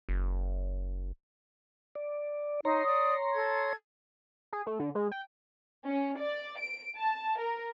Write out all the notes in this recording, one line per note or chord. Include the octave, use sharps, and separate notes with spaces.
F#1
D5
D#4 C#5 A#5 C6
D5 D#6
A4 G#6
G#4
A3
D3
G#3
G5
C#4
D5
D7
A5
A#4